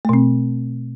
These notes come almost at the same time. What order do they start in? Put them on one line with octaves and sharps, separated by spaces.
A3 B2 C4